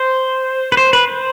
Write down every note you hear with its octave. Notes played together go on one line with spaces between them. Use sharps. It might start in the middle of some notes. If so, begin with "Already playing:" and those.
Already playing: C5
B4
C5
B4
C5